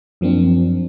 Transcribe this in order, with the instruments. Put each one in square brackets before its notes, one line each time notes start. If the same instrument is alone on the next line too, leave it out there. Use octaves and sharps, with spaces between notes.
[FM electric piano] F#2 F3 A#3 C4 D4